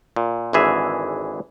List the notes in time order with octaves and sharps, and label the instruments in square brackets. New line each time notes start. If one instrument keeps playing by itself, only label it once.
[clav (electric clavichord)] A#2
G#1 D3 E3 G#4 E5